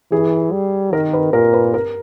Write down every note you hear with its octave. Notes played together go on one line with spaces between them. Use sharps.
E3 G#4
G3
D#3 A#4
B4
A#2 A#4
B4
A#4